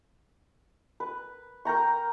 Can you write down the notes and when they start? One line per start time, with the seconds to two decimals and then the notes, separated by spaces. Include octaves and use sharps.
1.00 B4
1.65 A#4 G5 A#5 C#6